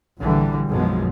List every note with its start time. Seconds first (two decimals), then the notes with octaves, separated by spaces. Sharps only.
0.19 A#1 D3 E3 G3
0.69 B1 F#2 B2 F3 G#3